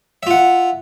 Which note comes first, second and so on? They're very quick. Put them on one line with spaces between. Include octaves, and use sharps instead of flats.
E5 F4 F#5